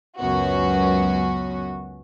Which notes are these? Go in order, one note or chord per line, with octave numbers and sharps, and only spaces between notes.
C#2 F#2 B3 C#4 F#4